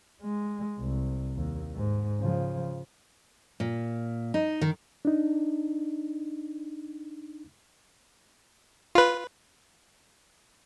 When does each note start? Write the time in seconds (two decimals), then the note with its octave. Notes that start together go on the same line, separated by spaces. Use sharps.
0.22 G#3
0.80 C2
1.37 D#2
1.75 G#2
2.20 C#3 F3
3.60 A#2
4.34 D#4
4.61 D#3
5.05 D4 D#4
8.95 F4 B4